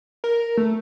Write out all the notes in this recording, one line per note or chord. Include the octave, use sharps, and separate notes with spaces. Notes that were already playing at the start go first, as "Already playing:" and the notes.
A#4
A3